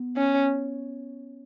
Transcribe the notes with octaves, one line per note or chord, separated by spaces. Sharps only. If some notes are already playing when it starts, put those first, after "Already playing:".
Already playing: B3
C#4